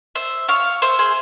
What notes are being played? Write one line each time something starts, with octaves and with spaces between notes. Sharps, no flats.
C5 E5
C#5 F5
C5 E5
G#4 C5